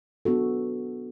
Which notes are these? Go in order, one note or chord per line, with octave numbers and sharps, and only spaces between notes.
B3 D4 F#4 A4